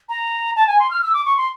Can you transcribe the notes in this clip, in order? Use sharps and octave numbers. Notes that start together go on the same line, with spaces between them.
A#5
A5
G#5
C6
F6
E6
D6
C#6
C6